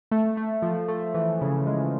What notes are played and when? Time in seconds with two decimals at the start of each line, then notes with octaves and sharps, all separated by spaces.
0.11 A3
0.37 A3
0.62 F3
0.88 A3
1.14 E3
1.41 C#3
1.67 G#3